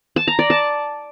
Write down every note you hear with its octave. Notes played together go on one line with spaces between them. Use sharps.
A5
A#5
D5
A5